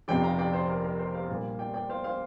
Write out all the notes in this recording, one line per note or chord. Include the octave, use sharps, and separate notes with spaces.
F1 F2 C3 D5 G5
F5 A#5
D5 G5
C5
A#4 D5
A#4
C5
C5 F5
A#1 A#2 G3 A#3
D5 G5
D5 G5
C5 F5
C5 F5